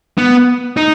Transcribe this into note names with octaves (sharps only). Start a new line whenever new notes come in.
B3
D#4